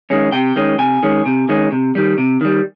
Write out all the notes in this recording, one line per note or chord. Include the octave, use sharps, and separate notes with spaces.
D#3 G#3 C#4
C3 G5
D#3 G#3 C#4
C3 G#5
D#3 G#3 C#4
C3
D#3 G#3 C#4
C3
D#3 G3
C3
D#3 G3